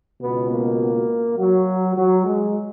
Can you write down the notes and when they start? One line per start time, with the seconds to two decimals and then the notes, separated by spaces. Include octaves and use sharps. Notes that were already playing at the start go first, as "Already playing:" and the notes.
0.21 C#2 B2 B3
0.50 A#3
1.37 F#3
1.96 F#3
2.25 G#3